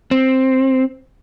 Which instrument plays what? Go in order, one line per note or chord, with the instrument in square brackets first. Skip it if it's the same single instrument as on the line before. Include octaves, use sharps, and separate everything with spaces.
[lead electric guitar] C4